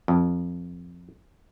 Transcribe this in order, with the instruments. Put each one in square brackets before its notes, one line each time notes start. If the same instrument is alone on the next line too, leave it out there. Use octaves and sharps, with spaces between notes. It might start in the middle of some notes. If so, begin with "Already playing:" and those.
[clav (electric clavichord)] F2